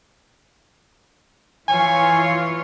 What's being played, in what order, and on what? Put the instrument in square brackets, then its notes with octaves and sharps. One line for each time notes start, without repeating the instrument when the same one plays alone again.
[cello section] E3 F4 C#5 [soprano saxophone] G#5